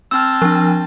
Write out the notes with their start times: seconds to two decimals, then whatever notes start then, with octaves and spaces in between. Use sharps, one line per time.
0.11 C4 A5 E6 F6
0.42 F3 D4